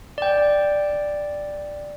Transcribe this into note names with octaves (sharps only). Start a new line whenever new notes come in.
D5 G5